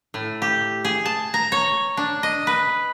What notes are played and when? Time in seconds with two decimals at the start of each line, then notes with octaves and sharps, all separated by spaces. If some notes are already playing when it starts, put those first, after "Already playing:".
0.14 A2
0.42 G4
0.85 G#4
1.06 A5
1.34 A#5
1.52 C#5
1.97 D4
2.23 D#5
2.47 B4